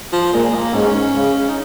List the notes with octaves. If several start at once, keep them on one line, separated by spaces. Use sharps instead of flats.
F3
A#2 G#3
A#3
G#2 C#4
C#3
D#4